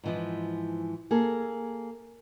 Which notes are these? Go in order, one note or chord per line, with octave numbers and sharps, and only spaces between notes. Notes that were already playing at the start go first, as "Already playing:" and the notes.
G#2 E3 F3
A#3 G#4 A4